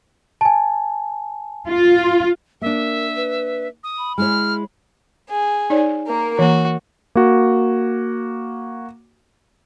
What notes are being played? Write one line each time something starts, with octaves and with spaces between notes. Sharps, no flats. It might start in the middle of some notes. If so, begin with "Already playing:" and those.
G#5 A5
F4
A#3 D4 A#4 E5
B4
D#6
B5
G#3 E4 C#5 F6
G#4
D#4 C#5 D5
A#3 A#4
E3 A#3 F#4 A#5
A#3 F#4